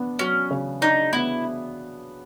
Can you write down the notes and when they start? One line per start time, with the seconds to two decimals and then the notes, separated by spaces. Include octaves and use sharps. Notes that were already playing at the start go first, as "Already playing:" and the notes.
Already playing: B3 D4
0.19 F#3 C#4
0.51 C#3
0.81 D4 D#4
1.13 B3 E4